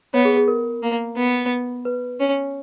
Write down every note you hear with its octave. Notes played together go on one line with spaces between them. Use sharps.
B3 C#5
G#4
G#4
A#4
A#3
B3
B4
C#4